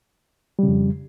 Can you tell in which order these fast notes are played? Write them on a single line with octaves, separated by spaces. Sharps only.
G3 C#3 F2